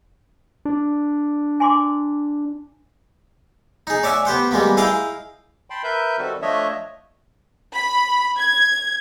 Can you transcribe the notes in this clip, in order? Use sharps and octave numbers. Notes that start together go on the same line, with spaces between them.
D4
G#5 C6 D6
D#4 G#4
C#5 D5 E5 F#5 G#5
B3 G4 C5 F#5
G3 G#3 A#3 B3
E4 G#4 D#5 F5 G5 A#5
G5 A5 B5 C6
A#4 B4 E5 G6
D#3 G3 C4 F#4 A4
F3 A3 D4 C#5 D#5 E5
B5
G#6